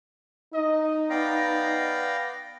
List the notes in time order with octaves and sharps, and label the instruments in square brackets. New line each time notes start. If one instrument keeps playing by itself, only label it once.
[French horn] D#4 [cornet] D#5
[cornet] B3 [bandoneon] D5 F5 G5 [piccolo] A#6